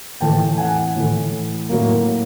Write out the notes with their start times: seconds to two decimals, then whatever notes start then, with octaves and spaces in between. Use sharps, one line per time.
0.21 A2 E3 A3 G5 A5
0.58 F#5 G#5
0.95 A2 E3 A3
1.69 A2 F#3 A#3